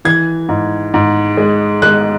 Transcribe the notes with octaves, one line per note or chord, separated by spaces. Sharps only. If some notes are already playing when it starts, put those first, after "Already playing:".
E3 G#6
G#2
G#2
G#3
G#3 F#6